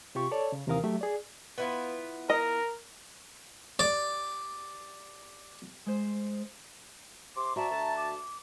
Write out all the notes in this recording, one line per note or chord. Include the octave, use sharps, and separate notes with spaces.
C3 F4 G4 C#6
A4 C#5 D5 A5
C#3
D#2 C3 E3 A#4 F5 D#6
F#3 A3 G4 E5
G#4 D5
B3 E4 F4
A#4 D#5
G4 D5
G#3 C5
C3 C6 D6
C4 F#4 D5 E5 A5 A#5
D2 A5
D6